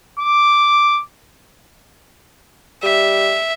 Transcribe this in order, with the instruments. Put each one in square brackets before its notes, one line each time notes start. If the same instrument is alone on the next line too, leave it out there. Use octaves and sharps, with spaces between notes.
[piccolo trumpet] D6
[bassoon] G3 [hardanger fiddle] E5